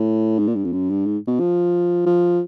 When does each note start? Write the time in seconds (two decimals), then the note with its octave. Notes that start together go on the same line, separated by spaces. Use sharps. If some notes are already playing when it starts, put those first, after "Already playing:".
Already playing: A2
0.39 G#2
0.47 A#2
0.56 G2
0.65 F2
0.73 F#2
0.90 G2
1.06 G#2
1.28 B2
1.40 F3
2.06 F3